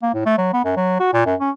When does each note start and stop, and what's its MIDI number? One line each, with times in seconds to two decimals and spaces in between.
0.03 0.10 58
0.14 0.23 45
0.26 0.35 57
0.38 0.50 54
0.53 0.61 59
0.65 0.72 42
0.76 0.99 54
1.00 1.08 66
1.13 1.23 46
1.26 1.35 42
1.40 1.50 61